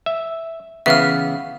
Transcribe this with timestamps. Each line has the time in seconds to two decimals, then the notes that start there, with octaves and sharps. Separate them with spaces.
0.06 E5
0.86 C#3 E3 B3 E5 F5 F6